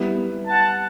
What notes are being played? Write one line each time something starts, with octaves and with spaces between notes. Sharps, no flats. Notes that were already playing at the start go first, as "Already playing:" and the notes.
Already playing: G3 B3 E4
F#5 A5